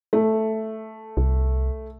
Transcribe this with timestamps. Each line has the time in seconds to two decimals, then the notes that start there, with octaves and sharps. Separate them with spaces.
0.13 A3
1.17 C2